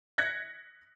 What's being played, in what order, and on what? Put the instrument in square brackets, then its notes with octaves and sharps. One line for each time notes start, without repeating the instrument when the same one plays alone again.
[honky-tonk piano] F#6 G#6 A#6 B6 C#7